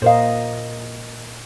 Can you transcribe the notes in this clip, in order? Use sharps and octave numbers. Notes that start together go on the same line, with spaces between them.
A#2 A#4 C5 D#5 F5